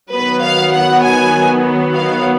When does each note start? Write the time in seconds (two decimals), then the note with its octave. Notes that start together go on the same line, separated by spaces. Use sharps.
0.14 D#3 F#3 B3 B4
0.44 F5
0.74 F#5
1.04 G#5
1.95 F5